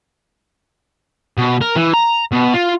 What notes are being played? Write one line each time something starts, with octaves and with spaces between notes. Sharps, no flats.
B2
A#4
E3
A#5
B2
F4